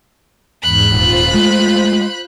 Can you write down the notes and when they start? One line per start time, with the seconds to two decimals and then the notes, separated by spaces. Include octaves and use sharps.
0.62 E2 G#2 B5 F#6
0.92 D#1 F4 C5
1.34 G#3 A3